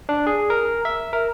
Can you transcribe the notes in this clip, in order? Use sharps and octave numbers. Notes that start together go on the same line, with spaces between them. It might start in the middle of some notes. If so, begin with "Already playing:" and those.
D4
G#4
A#4
E5
A#4